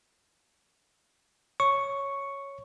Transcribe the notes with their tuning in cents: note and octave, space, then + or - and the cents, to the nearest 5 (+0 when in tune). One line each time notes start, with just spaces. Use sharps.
C#5 +0 C#6 +0